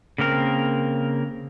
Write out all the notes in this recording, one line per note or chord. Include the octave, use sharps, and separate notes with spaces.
C#3 A#3 C4 A#4